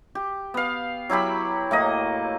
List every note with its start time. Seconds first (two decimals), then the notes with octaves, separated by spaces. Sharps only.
0.15 G4
0.54 B3 F5
1.10 F#3 E4 G4 B5
1.71 A2 A#3 D#5